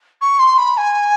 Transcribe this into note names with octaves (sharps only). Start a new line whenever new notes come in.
C#6
C6
B5
G#5